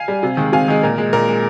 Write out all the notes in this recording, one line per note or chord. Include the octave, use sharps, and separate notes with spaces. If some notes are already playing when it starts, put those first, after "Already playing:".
Already playing: F5 G#5
G3
C3
D#3 G#3
C3 F5 G#5
D#3 G#3
A#2 A#4
G#3
A#2 A#4
G#3